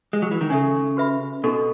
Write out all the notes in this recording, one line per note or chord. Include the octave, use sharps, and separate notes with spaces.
G#3
F#3
E3
D#3
C#3 A4 E5 G#5
F#4 B4 E5 B5
B2 D#4 F#4 A4